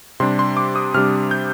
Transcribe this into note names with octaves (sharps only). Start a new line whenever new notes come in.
C3 G3 D4 C6
C6
D6
D#6
C3 G3 D4 F6
G6